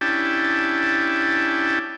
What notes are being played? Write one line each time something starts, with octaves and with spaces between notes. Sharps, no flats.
C#4 D4 E4 G4 G5 A5